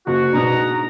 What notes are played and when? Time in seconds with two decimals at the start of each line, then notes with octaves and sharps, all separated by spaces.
0.07 F#1 F#4
0.33 G#2 B2 D4 A#5